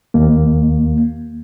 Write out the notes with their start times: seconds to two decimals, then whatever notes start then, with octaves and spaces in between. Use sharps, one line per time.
0.14 D#2 A#3